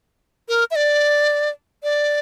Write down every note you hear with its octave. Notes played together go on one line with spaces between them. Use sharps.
A#4
E5
D5
D5